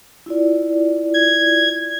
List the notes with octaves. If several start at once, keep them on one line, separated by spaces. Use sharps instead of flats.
E4 F4 D5
G#6